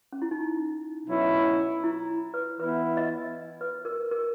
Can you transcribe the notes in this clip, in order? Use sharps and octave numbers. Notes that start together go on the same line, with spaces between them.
C#4
E4
D#4
B2 F#3 C#4 E4
E4
B4
E3 B3 E4 B4
D#5
B4
A#4
A#4